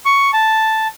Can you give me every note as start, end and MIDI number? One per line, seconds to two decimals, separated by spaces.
0.05 0.31 85
0.33 0.88 81